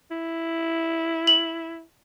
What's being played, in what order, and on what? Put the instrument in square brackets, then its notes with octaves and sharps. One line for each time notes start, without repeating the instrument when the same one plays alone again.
[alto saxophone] E4
[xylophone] F#7